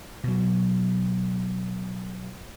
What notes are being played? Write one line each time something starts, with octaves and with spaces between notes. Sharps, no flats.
B2 F#3